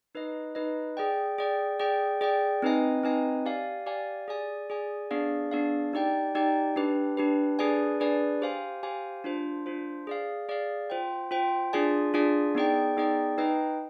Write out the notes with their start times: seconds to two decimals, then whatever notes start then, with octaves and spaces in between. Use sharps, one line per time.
0.15 D#4 B4 D#5
0.55 D#4 B4 D#5
0.97 G#4 D5 G5
1.39 G#4 D5 G5
1.79 G#4 D5 G5
2.21 G#4 D5 G5
2.62 C4 D#4 B4 D#5 G#5
3.03 C4 D#4 B4 D#5 G#5
3.46 G4 D5 F5 G#5
3.86 G4 D5 F5 G#5
4.28 G#4 D5 G#5
4.70 G#4 D5 G#5
5.11 B3 D4 G#4 D5 F5
5.51 B3 D4 G#4 D5 F5
5.93 D#4 G4 D5 G5
6.35 D#4 G4 D5 G5
6.76 D4 G4 B4
7.17 D4 G4 B4
7.59 D4 G#4 B4 D5 G#5
8.00 D4 G#4 B4 D5 G#5
8.42 G4 C5 F5 G#5
8.83 G4 C5 F5 G#5
9.24 D4 F4 C5
9.66 D4 F4 C5
10.07 G#4 D5 F5
10.49 G#4 D5 F5
10.90 F4 C5 G5
11.31 F4 C5 G5
11.73 D4 F4 G#4 D5 G#5
12.14 D4 F4 G#4 D5 G#5
12.55 B3 D#4 G#4 D5 G5
12.97 B3 D#4 G#4 D5 G5
13.38 D#4 B4 D#5 G5